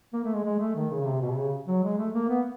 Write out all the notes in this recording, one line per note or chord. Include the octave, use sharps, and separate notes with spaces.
A#3
A3
G#3
G#3
A3
D#3
C#3
C#3
C3
B2
C3
C#3
F#3
G#3
A3
A#3
B3